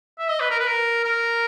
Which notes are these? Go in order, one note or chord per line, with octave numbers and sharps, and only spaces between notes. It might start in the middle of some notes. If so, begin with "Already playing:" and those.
E5
D#5
B4
A#4
B4
A#4
A#4